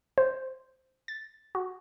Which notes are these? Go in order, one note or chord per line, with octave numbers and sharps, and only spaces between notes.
C5
A6
F#4